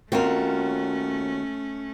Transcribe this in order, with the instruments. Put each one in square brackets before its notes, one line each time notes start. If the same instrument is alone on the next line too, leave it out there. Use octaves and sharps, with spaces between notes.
[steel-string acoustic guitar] D#2 F#4 [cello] A3 C#4 [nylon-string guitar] C4 F4 A#4